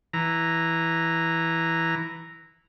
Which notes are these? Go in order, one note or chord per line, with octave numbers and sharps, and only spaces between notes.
E3 A#5